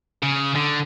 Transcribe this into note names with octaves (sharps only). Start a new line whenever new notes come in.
C#3
D3